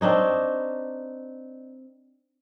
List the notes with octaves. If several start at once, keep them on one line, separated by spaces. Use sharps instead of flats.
C4 D4 D#4 C#5